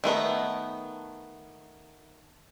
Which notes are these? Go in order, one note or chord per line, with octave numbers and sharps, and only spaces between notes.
D#3 A3 B3 A#5